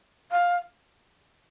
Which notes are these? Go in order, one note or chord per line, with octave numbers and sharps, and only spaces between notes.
F5